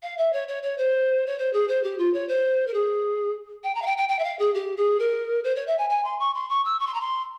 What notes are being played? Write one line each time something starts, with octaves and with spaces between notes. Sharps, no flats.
F5
E5
C#5
C#5
C#5
C5
C#5
C5
G#4
C5
G4
F4
C#5
C5
A#4
G#4
G5
A#5
F5
G5
G5
G5
E5
F5
G#4
G4
G#4
A#4
C5
C#5
E5
G#5
G#5
C6
C#6
C6
C#6
E6
C#6
C6
A#5
C6